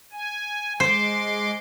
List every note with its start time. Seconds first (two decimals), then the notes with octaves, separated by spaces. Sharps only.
0.12 G#5
0.80 G#3 C5 C6 D6